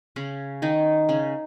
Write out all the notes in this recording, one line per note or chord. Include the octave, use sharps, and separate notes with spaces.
C#3 C#4
D#3 D#4
C#3 C#4